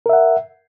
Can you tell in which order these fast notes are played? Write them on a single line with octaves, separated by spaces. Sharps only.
A#4 E5 F#5